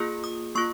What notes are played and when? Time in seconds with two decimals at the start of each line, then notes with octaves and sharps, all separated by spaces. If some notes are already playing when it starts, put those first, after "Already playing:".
Already playing: A#3 F4 G#4
0.24 D#6
0.55 A#3 F4 C#6